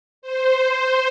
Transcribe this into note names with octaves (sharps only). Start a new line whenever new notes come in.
C5